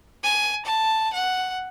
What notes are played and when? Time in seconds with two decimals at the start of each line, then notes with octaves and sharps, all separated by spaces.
0.23 G#5
0.65 A5
1.12 F#5